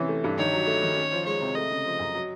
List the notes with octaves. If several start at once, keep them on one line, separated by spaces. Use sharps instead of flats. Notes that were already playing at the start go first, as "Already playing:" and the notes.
Already playing: C3 E3 C#4
A3
G2
D#3 C#5
F#3
A3
D#3
C#4
F3
G#3 C#5
C3
A3 D#5
C#3
F3
F#2
F#3